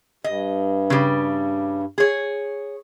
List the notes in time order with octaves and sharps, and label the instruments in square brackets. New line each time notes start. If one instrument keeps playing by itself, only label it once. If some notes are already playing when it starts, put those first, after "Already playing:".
[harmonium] G2 [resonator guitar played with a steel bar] D#5
[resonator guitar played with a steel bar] C#3 G3
G#4 C#5